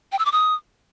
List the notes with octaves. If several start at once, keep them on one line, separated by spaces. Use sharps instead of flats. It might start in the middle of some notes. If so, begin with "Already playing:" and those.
G5
E6
D6
D#6